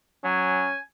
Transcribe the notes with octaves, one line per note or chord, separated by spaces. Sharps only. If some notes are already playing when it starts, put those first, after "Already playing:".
F#3 C#4 G#5